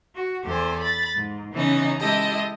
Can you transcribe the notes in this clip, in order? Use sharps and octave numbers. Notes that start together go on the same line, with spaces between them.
F#4
E2 G4 A4 C5 G#5
B5 A6
G#2
C#3 E3 B3 C#4 D#4
G#3 E4 G4 A4 D#5